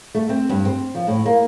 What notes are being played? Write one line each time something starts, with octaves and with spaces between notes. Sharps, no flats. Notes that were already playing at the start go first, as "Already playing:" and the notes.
A3
C4
G2
C4
F3
A2
A#3